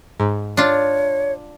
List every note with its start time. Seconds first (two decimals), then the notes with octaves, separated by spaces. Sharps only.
0.20 G#2
0.57 D4 F4 C#5